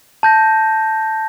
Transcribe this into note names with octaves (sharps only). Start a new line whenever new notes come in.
A5 G6 A#6